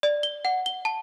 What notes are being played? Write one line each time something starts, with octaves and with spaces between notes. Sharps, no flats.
D5
G7
F#5
G7
A5